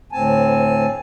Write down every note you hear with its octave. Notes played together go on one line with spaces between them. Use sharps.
D2 A2 C4 G#5 A5